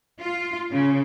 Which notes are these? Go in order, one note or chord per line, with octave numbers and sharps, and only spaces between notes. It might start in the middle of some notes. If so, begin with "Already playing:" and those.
F4
C#3